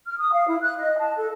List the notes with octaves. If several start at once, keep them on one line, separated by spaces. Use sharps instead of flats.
F6
D#6
F5
E4
F#6
D#5
A5
A4